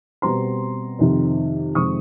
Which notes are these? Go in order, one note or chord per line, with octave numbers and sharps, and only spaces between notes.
B2 G3 C4 A#5 C6
F2 C3 D#3
F2 C3 D#3 G#3 C4 C#6 D#6